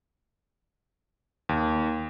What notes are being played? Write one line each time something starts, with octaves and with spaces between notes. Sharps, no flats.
D#2